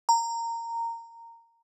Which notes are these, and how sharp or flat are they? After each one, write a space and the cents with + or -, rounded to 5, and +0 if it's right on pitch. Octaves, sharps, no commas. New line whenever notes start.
A#5 -15